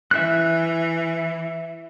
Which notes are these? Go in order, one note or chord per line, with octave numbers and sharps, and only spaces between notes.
E3 E5 F#6